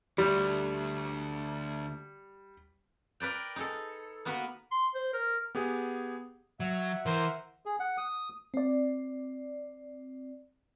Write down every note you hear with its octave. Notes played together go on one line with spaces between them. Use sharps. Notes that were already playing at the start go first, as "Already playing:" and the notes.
D2 G3
A#4 B4 D5 G5
D#4 G#4 A4
A#3 B3 F#4 B4
C6
C5
A#4
B3 G4 G#4 F#5
F#3 E5 F#5
E3 A#4 C5
G#4
F#5
D#6
C4 D5